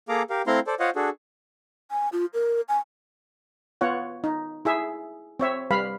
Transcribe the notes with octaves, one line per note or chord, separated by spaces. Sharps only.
A#3 G#4 A4 F5 A#5 D6
G4 A#4 F5
A3 C4 E4 F5 A#5 C6
A4 C5 D5
F4 C5 C#5 D#5 F5 F#5
D4 F#4 G#4 A4
G#5
F4
A#4
G#5
B3 F4 C#5 F#5
D#4
E4 G#4 E5
C4 C#5 E5
G3 B4 F5 B5